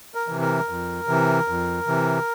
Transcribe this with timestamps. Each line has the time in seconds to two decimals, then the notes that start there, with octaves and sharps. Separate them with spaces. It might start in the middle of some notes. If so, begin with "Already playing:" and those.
0.15 A#4
0.28 C3 E3
0.41 A#4
0.69 F2
1.08 C3 E3
1.48 F2
1.87 C3 E3